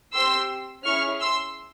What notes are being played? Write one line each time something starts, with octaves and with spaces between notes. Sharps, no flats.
C4 G4 C6 E6
C#4 E4 G#4 C#6 F6
C6 E6